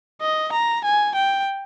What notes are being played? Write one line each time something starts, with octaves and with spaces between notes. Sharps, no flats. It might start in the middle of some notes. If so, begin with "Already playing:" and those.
D#5
A#5
G#5
G5